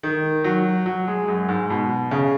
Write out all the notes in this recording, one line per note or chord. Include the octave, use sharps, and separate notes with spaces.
D#3
F#3
F#3
G#3
F#2
G#2
B2
C#3